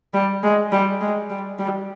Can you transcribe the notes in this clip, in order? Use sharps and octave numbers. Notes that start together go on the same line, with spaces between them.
G3
G#3
G3
G#3
G3
G3